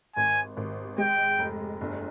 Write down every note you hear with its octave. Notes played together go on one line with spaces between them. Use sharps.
G#1 G#5
G#1
G#3 G5
F1
G1